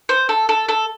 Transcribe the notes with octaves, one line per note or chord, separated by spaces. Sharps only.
C5
A4
A4
A4